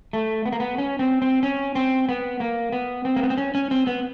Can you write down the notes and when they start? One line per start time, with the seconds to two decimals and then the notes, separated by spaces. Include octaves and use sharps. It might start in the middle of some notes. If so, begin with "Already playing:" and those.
0.13 A3
0.46 B3
0.52 A#3
0.60 B3
0.78 C#4
0.99 C4
1.22 C4
1.43 C#4
1.75 C4
2.09 B3
2.40 A#3
2.72 B3
3.05 C4
3.16 A#3
3.23 B3
3.30 C4
3.38 C#4
3.55 C#4
3.71 C4
3.87 B3